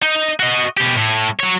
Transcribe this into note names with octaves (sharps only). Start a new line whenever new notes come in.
D#4
F#4 D#5
B2 G4
A2
F#3 C#5